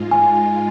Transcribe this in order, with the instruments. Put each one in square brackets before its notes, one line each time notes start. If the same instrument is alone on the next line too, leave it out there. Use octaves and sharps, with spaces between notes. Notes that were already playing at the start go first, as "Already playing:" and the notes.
Already playing: [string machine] G#2 G#3 F4
[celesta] G#5